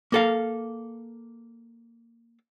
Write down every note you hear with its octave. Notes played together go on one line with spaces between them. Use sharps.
A#3 A4 F5